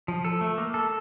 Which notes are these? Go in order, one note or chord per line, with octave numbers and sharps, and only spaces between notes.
F3
A4
A3
A#3
A4